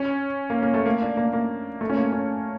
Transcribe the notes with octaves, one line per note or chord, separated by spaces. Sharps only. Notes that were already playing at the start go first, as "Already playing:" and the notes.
Already playing: C#4
A#3
A#3
A3
A#3
D4
A#3
A#3
A3
C#4
A#3
C#4